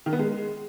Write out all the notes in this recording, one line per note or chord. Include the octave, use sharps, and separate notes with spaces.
D#3
B3
G#3